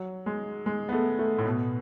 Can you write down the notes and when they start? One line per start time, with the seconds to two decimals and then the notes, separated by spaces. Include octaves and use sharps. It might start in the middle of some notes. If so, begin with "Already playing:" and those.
Already playing: F#3
0.26 G#3
0.66 G#3
0.89 B3
0.93 A3
1.19 A3
1.38 A2
1.45 B2